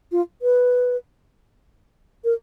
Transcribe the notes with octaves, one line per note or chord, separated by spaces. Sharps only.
F4
B4
A#4